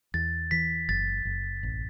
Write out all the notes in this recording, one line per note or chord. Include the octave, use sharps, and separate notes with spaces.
E2 A6
E3 B6
F#1 A6
F#1
A1